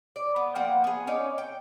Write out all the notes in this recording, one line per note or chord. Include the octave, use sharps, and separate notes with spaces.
D5
B3
F3 A#3 F#5 G5
B3 G#4
C#4 D#4 C#5 D5
G5